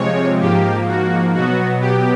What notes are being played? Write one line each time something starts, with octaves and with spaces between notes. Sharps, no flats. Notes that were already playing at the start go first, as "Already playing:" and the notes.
Already playing: C3 F3 G#3 C4 C#5
G#2 F3 A#3 G4
F#4
B2 F#3 B3 F#4
G4